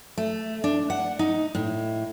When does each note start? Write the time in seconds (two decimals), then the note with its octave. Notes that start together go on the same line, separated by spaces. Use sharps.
0.18 A3
0.64 D4
0.90 F#5
1.19 D#4
1.55 A2